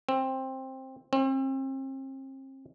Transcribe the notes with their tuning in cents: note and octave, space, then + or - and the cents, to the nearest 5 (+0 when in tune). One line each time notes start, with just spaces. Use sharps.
C4 +15
C4 +40